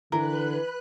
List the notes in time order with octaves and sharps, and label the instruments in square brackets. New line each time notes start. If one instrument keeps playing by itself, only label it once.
[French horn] D3 [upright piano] E3 [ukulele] A#4 [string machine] B4 F#6